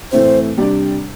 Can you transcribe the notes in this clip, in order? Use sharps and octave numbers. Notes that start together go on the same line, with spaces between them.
A2 E3 A3 C4 C5
C3 G3 D4 G4 D5